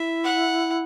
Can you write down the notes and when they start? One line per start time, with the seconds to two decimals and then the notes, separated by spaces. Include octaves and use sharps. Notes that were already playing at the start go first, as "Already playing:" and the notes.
Already playing: E4 E5
0.25 F#5